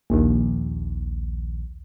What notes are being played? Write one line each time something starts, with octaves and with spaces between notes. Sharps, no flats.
A#1 D#2